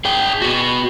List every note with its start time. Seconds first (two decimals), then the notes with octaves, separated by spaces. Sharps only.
0.05 G#4 G5
0.42 B3 F#4